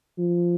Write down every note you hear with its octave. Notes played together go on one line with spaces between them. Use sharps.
F3